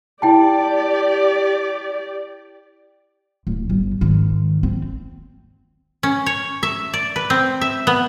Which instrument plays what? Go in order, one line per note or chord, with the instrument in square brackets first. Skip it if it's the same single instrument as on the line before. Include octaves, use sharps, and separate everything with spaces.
[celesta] E4 G5 A5 [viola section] G4 D5
[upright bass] D1
G1
G#2 D#3
C4
[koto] C#4
C#5
E5
D5
B4
C4
E5
B3